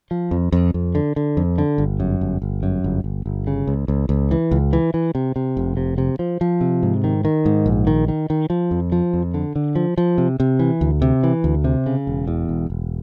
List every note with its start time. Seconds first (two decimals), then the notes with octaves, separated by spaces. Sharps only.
0.11 F3
0.31 F2
0.52 F2
0.74 F2
0.95 D3
1.16 D3
1.37 F2
1.58 D3
1.78 G1
2.00 F#2
2.21 G1
2.42 G1
2.63 F#2
2.84 G1
3.04 G1
3.26 G1
3.47 C#3
3.67 C#2
3.88 C#2
4.09 C#2
4.31 E3
4.51 C#2
4.73 E3
4.94 E3
5.15 C3
5.36 C3
5.57 F1
5.77 C3
5.98 C3
6.19 F3
6.41 F3
6.61 C3
6.83 G#2
7.04 D#3
7.25 D#3
7.46 G#2
7.66 A#1
7.87 D#3
8.08 D#3
8.30 D#3
8.50 F3
8.71 F2
8.92 F3
9.13 F2
9.34 D3
9.56 D3
9.76 F3
9.98 F3
10.18 C3
10.40 C3
10.59 E3
10.81 D2
11.02 C3
11.23 E3
11.44 D2
11.64 C3
11.86 C#3
12.07 E1
12.28 E2
12.49 E1
12.70 E1